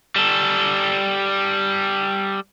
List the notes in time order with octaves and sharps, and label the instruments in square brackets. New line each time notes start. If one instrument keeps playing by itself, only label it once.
[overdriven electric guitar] G3 A4